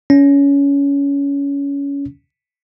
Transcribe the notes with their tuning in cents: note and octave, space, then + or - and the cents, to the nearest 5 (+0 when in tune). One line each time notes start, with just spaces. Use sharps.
C#4 +20